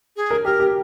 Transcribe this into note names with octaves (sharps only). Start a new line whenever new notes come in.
G#4
A#4
G4 A#4
G4